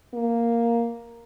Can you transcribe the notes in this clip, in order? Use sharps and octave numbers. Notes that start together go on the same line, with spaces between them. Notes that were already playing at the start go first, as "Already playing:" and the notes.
A#3